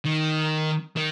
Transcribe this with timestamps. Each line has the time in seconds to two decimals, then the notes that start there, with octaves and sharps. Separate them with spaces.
0.05 D#3
0.96 D#3